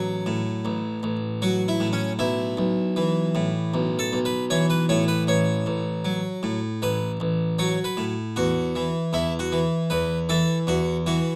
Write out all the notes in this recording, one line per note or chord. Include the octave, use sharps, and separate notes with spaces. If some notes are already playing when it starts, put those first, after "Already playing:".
Already playing: A1 F#3
A2
A1
A1
F#3 F#4
E4
A2
C#4
B1 E4
B1
E3
A2
B1
A4
B1
B4
E3 C#5
B4
A2 C#5
B4
A1 C#5
A1
F#3
A2
A1 B4
A1
F#3 C#5
B4
A2
E2 F#4
E3
E2 E4
F#4
E3
E2 B4
E3 A4
E2 F#4
E3 F#4